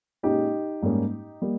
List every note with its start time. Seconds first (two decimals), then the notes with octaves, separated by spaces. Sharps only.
0.23 A#2 G#3 C#4 D#4 G4
0.82 G#2 G3 A#3 C#4
1.42 G3 A#3